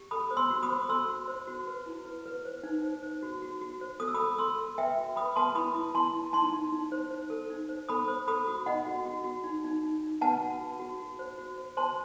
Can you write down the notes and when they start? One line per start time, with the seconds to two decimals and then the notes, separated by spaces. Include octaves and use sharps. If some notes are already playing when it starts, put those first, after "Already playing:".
Already playing: G4
0.11 A4 B5 D#6
0.31 C5
0.37 C6 E6
0.51 F#4
0.63 B5 D#6
0.70 C5
0.89 A4 C6 E6
1.08 F#4
1.28 C5
1.48 F#4
1.67 B4
1.86 E4
2.05 B4
2.26 B4
2.45 C5
2.63 D#4
2.84 C5
3.03 C5
3.23 F#4
3.42 F#4
3.61 F#4
3.81 C5
4.00 A4 D#6
4.08 E6
4.14 A4 B5 D#6
4.38 A4 C6 E6
4.59 A4
4.78 B4 E5 G5
4.98 F#4
5.16 B4 B5 D#6
5.36 B4 A5 C6
5.55 E4 B5 D#6
5.75 E4
5.95 E4 A5 C6
6.13 E4
6.33 D#4 A5 C6
6.53 D#4
6.72 D#4
6.92 C5
7.11 C5
7.30 A4
7.50 D#4
7.69 C5
7.89 A4 B5 D#6
8.08 C5
8.27 A4 B5 D#6
8.48 F#4
8.66 D#4 D#5 F#5
8.86 F#4
9.05 F#4
9.24 F#4
9.44 D#4
9.64 D#4
9.83 D#4
10.03 D#4
10.21 B4 F#5 A5
10.41 F#4
10.61 F#4
10.80 F#4
11.00 F#4
11.19 C5
11.38 F#4
11.58 C5
11.77 C5 A5 C6